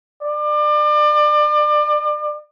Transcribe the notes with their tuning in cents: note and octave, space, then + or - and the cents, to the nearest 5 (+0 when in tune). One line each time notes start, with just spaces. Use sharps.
D5 +30